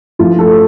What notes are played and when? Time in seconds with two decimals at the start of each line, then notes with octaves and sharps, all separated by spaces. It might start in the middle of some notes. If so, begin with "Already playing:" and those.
0.19 G2 F3 A3 E4 F4
0.39 A4